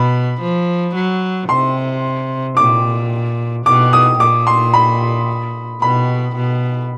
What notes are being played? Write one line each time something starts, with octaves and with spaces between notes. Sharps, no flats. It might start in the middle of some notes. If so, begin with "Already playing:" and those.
Already playing: B2 B5
F3
F#3
C3 C6
A#2 D6
B2 D6
D#6
A#2 D6
C6
B5
B2 B5
B2